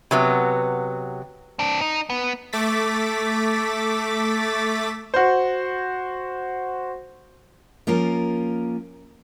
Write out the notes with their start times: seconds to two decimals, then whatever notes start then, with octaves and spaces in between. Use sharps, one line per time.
0.11 C3 F#3 B3
1.59 C4 D4
1.81 D#4
2.10 B3
2.53 A3 D6 A6 B6
5.14 F#4 C5
7.87 F3 A#3 C#4 F4 A#4